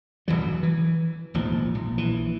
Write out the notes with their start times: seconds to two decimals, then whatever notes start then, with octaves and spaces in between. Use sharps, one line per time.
0.28 D1 C2 E3 F#3
0.63 E3
1.34 E1 A1 D#2 F3
1.75 A#1
1.98 A#1 E3